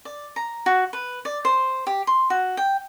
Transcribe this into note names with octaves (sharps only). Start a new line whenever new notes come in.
D5
A#5
F#4
B4
D5
C5
G4
C6
F#4
G5